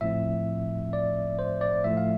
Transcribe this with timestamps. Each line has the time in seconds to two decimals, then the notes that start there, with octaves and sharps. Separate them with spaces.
0.01 A2 F3 C4 E5
0.93 D5
1.39 C5
1.61 D5
1.84 A2 F3 A3 E5
1.97 F5